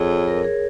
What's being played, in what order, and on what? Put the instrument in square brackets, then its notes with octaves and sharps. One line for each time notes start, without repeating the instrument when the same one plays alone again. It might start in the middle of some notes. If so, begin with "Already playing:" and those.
Already playing: [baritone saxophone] F2 [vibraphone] G#4 C#5
[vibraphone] C#5
A#4
G#4